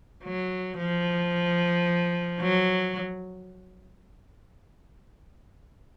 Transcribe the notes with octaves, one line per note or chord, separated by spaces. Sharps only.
F#3
F3
F#3